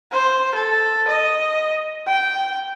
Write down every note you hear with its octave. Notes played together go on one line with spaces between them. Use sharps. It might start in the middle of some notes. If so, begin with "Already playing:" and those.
C5
A4
D#5
G5